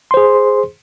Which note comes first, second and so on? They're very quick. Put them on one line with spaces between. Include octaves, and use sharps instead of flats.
C6 C5 G#4